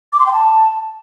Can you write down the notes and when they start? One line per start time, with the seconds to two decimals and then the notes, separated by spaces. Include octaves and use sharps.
0.13 D6
0.19 C6
0.26 G5
0.33 A5